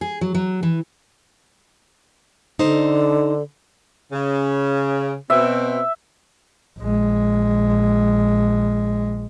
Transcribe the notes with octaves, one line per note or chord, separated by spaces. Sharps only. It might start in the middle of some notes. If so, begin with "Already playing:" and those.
G#4
F#3
F#3
E3
D3 D#4 A4 C5
C#3
B2 C4 E5
A#1 G#3